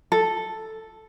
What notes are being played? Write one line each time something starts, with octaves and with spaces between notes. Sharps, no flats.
A4